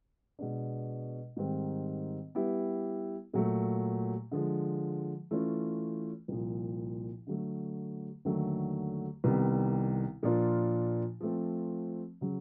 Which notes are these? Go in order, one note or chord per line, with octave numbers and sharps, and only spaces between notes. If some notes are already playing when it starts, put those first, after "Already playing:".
B2 G#3 B3 D4
G#2 D#3 G3 C4
G3 B3 E4 G4
A#2 F#3 A3
D3 F3 G#3
E3 A3 C#4 F4
C2 A#2 F3
D3 F#3 A3
D#2 D3 F#3 A3
C2 C3 D#3 G3 B3
A#2 F3 A#3 D4 F4
F3 A3 C4
C#3 F#3